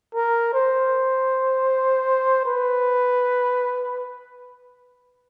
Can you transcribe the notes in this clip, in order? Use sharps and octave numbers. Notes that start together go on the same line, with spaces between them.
A#4
C5
B4